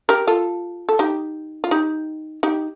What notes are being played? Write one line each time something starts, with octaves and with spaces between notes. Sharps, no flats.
G4 A#4
F4 A4
A4
D#4 G4
F4
D#4 G4
D#4 G4